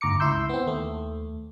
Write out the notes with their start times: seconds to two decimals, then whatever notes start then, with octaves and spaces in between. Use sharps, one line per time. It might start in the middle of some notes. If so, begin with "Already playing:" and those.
0.01 G1 D2 A#5 D6 C#7
0.20 C#2 E4 C6 E6 G6
0.49 B3 C4
0.67 D#2 A3